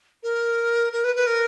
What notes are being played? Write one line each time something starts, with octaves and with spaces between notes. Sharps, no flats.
A#4
A#4
B4
B4
A#4